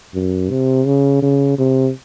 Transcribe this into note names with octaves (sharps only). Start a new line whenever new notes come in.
F#2
C3
C#3
C#3
C3